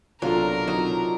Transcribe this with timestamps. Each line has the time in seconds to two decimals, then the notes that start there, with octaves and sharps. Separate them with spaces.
0.22 B1 C3 F#3 D4 F4 A4 A#4
0.68 F#3 D#4